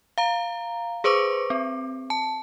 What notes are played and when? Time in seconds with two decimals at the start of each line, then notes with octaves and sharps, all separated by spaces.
0.18 F5 A#5
1.04 G#4 B4 C5 C#6 D6
1.50 C4
2.10 A5